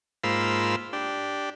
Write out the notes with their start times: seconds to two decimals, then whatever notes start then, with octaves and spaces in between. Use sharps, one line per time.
0.24 G#2 A#3 F4 C5 B5 E6
0.93 D4 G4